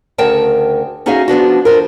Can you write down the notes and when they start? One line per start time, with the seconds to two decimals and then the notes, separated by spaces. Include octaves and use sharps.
0.18 D2 C#3 A#4 G5 A5
1.06 C#4 D#4 F#4 G#4 E5 F5
1.28 F3 B3 D4 F#4
1.65 F2 F3 A#4